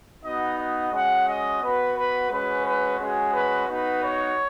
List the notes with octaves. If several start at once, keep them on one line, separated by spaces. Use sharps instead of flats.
B3 D#4 F#4 D#5
D#5
G#3 C#4 F#4 F#5
D#5
B3 F#4 B4
B4
G#3 C#4 F#4 B4
B4
G#3 C#4 F#4 G#4
B4
B3 D#4 F#4 B4
C#5